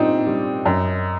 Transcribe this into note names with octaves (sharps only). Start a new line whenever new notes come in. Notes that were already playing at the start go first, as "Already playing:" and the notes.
Already playing: A#2 G3 C4 D4 D#4
G3
F#2